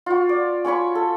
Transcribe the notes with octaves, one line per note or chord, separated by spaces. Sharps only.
F4 F#4
D5
C#4 C#5 B5 C#6
A4